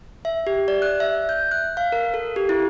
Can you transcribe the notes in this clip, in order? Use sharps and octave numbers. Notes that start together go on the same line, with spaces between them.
E5
G4
D5
F#6
E5
G6
F#6
F5
A#4
A4
G4
E4